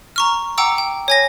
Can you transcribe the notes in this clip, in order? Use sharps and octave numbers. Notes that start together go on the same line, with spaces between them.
A#5 C#6 F6
F#5 G5 A#5 D6 E6
G5
C#5 G#5 A#6